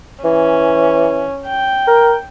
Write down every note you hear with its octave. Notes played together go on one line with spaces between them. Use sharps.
E3 C#4
G5
A#4